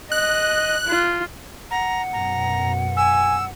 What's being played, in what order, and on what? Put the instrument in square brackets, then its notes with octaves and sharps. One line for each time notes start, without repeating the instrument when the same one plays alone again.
[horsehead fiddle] D#5 [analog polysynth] F#6
[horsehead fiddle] F4
[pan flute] F#5 [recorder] A#5
[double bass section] F#2 B2 [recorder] A#5
[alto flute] G#5 [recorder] E6